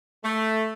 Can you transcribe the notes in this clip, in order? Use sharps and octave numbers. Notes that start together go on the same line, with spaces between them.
A3